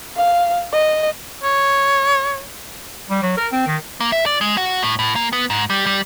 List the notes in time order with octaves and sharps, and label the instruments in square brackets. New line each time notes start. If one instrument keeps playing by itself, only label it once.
[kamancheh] F5
D#5
[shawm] C#5
[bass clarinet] G3
F#3
A#4
C4
D#3
[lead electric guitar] A#3
E5
D5
G#3
F#4
A2
A2
A#3
B3
G#2
G3
G3